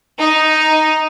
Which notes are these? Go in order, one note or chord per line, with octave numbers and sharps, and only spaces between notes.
D#4